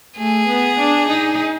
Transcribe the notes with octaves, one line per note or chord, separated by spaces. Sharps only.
A3 G#4
B3
D4
D#4